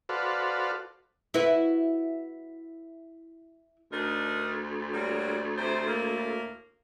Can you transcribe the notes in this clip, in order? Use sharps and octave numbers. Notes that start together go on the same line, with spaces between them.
F#4 A4 B4 C5 D5 F5
E4 F#4 B4
D2 D4 D#4 A#4
F#3 G3 A#3
C3 C5
A2 A#3